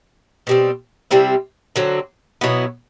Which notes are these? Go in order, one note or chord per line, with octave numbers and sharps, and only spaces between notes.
B2 G3 C4
C3 G3 C4 E4
D3 F#3 C4
B2 F#3 B3 E4